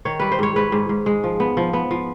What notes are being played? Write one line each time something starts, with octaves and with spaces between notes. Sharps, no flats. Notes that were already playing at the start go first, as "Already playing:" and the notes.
D#3 C#5
G3 B4
C5
G#2 C#5
G#2 B4
G#2
G#2
G#3
F3
B3
F3
B3
F3